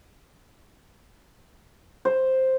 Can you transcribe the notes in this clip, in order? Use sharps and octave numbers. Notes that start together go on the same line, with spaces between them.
C5